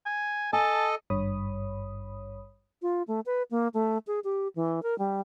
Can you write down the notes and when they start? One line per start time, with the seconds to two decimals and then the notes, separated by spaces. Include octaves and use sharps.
0.06 G#5
0.53 A4 D#5 G#5 A5
1.10 G#1 G2 C#5 B5 D#6
2.82 F4
3.08 A3
3.26 B4
3.51 A#3
3.74 A3
4.07 G#4
4.24 G4
4.56 E3
4.83 A#4
4.99 G3